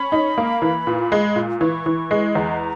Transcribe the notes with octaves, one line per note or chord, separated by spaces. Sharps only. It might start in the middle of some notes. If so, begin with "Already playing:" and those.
Already playing: C#4 B5
D#4
A#3
E3
A#2
G#3
A#2
E3 C#6
E3
G#3
E2 A#5